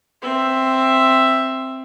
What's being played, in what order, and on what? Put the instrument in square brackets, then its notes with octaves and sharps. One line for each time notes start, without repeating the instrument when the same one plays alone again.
[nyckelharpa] C4 E5